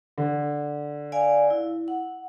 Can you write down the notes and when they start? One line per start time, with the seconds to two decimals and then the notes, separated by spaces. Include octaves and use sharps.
0.18 D3
1.12 D5 F5 G#5
1.50 E4
1.88 F#5